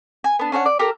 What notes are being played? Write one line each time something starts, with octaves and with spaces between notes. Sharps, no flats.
G#5
B3 D4
C#4 D4 C#5 F#5
D5
G4 A4 A#4 A#5